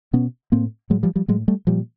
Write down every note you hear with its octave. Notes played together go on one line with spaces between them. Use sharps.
B2 B3 C#4
A2 A#3 C4
A2 F#3 G#3
F3 G3
F3 G3
A2 F#3 G#3
G3 A3
A#2 F3 G3